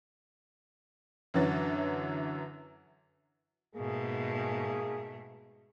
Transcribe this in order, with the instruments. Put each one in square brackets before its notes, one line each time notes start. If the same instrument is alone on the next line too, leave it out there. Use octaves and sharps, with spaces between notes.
[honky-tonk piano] F#2 D3 E3 F#3 A6
[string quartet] G#2 B2 A3 [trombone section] A#3 G#4